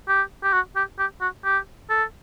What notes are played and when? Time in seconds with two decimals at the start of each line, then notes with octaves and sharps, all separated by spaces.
0.08 G4
0.43 G4
0.53 F#4
0.76 G4
0.99 G4
1.21 F#4
1.44 G4
1.90 A4